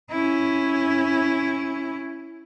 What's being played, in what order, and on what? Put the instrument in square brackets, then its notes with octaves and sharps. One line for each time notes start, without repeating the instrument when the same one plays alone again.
[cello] C#4 E4